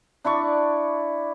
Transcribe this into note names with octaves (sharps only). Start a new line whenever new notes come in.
D4 E4 D5 C#6